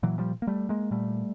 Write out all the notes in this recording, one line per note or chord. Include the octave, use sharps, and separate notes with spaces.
A#2 E3 F#3
F3 G3
A#3
G3 A3
G#3 A#3
A#2 G3 A3